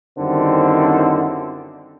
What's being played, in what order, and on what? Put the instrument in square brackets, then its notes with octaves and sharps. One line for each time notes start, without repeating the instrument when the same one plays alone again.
[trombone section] F#2 D3 D#3 G3 C4 E4